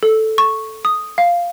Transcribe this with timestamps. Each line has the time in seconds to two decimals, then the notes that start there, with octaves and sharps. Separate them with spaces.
0.03 A4
0.38 C#6
0.85 D#6
1.18 F5